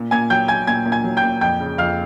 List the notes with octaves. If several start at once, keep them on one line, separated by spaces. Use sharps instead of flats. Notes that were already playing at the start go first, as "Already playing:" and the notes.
Already playing: A#2
A#2 G#5 G#6
F#3 G5 G6
F#3 G#5 G#6
A#2 G#5 G#6
A#2
G#5 G#6
F#3
G5 G6
A#2
F2 G5 G6
C#3
F2 F5 F6